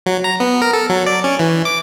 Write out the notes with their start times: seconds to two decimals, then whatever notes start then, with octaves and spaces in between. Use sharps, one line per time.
0.06 F#3
0.24 A#5
0.40 B3
0.62 A#4
0.73 A4
0.89 F#3
1.06 D5
1.24 C#4
1.39 E3
1.65 D6